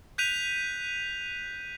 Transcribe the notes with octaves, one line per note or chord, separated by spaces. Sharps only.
F#6 G6 B6 D#7 F7